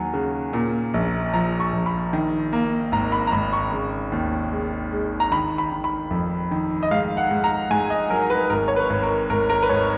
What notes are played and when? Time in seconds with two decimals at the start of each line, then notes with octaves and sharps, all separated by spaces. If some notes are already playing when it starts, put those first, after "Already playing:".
Already playing: D#2 F#3 F#5 G#5
0.13 C#3
0.53 A#2
0.94 A#1
1.33 F3 A#5
1.60 C#6
1.73 A#1
1.86 B5
2.13 D#3
2.53 A#3
2.92 G#1 A#5
3.12 B5
3.27 A#5
3.32 G#1 B5
3.53 C#6
3.72 C#3
4.12 D#2
4.52 G#3
4.92 G#3
5.20 A#5
5.32 D#3 B5
5.58 B5
5.72 D#3
5.84 B5
6.11 F2
6.51 D#3
6.83 D#5
6.91 G#2 F5
7.17 F#5
7.31 G#2
7.44 A#5
7.70 G#2 G#5
7.90 D#5
8.10 F#3 A#4
8.30 B4
8.50 G#1 A#4
8.68 C#5
8.76 B4
8.90 G#1
9.03 A#4
9.30 G#1 A#4
9.50 A#4
9.63 B4
9.69 G#1 C#5